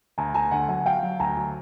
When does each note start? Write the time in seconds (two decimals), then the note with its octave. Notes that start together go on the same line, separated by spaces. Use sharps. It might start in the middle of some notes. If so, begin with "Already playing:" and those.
0.18 D2 G#5 A#5
0.34 D2 G#5 A#5
0.51 D3 F#5 G#5
0.69 F#3 F#5 G#5
0.86 F#3 F5 G5
1.03 F#3
1.19 D2 G#5 A#5
1.37 F#3